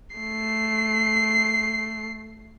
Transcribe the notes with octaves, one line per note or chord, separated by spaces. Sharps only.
A3 C7